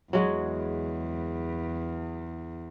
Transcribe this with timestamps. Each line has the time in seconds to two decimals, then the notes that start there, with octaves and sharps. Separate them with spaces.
0.13 E2 F#3 G#3 F#4